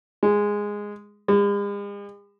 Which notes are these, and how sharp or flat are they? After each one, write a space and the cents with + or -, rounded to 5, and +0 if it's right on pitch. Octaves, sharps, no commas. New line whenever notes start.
G#3 -10
G#3 -45